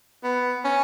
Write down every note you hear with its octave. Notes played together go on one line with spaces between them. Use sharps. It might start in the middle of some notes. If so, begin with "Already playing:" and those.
B3
C#4